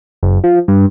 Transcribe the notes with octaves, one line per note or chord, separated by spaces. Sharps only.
F#1
F3
G2